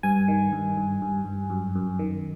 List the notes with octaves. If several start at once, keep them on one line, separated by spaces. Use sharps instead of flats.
G2 G#5
D#3
G2
G2
G2
G2
F#2
F#2
D#3